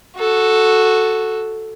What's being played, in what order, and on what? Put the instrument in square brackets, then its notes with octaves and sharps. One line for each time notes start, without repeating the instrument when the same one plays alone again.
[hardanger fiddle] F#4 A4